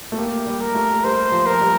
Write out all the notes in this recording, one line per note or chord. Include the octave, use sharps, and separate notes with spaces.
A3
A#3 G4
G3
A#4
A3
G3 C5
F3
A#4
G3